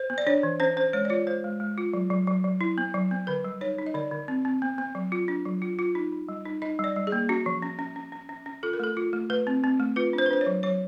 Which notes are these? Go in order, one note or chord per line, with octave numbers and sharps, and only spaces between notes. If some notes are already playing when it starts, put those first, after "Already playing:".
Already playing: C5
B3
D5
D4 C#5
E3
C#4 C5
C#4 C5
G#3 C#5
D5
F4 C#5
G#3 C5
G#3
G#3
F4
F#3
F#3
F#3
F#3
E4
B3
F#3
B3
D3 B4
G3
D#4 C#5
D#4
D#5
D3 D5
D3
C4
C4
B3
B3
F#3
F4
D4
F#3
F4
F4
D#4
D#4
G3
D#4
D#4 D#5
G3 D5
G3
G#4
A#3
C#4 F#4
F3
C#4
C#4
C#4
C#4
C#4
C#4
F4 A4
A#4
A3 A4
F4
A3
A3 B4
C4
C4
A3
F4 B4
D4
C5
B4
D4 C5
C#5
F#3
F#3 C#5